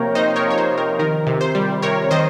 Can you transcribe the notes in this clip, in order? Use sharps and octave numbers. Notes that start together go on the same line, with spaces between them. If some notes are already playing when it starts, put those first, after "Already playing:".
Already playing: C3 F3 A#3 A#4 C#5 G5 A#5
D#4 C5 D#5
A#4 C#5
F3
C#5
C5
C3
A#4
D#3 A#4
C3
C5
G3
C3 A#4 C#5
D#3 C5 D#5